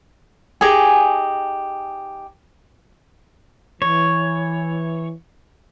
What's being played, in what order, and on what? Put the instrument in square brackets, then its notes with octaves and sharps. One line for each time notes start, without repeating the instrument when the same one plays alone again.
[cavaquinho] D#4 G4 G#4 G#5
[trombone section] E3 [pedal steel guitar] C#5